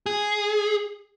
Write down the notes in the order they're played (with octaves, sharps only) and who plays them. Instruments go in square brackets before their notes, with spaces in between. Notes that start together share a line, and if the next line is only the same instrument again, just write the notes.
[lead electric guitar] G#4